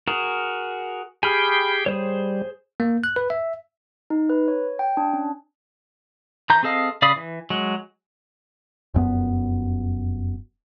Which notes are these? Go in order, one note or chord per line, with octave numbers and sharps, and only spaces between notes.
F#4 G#4 A#4
G4 G#4 G5 G#5 B5 F6
G3 G#4 C5 C#5
A#3
F#6
B4
E5
D#4
B4
C#5
G5
D4
C#4
E3 A#5 G6
C4 G#4 A4 D#5 F5
C#3 D5 F5 B5 D#6
E3
F#3 G#3
F1 F#2 B3